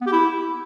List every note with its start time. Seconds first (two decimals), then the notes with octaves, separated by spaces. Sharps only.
0.01 B3
0.07 G4
0.12 E4